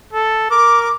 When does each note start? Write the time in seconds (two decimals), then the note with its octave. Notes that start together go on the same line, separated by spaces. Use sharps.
0.13 A4
0.51 A#4 D6